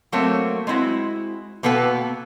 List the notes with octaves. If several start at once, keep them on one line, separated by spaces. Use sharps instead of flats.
F#3 A3 A#3 C4 C#5
G#3 C4 E4 F#4
B2 A#3 B3 A4 B4 G5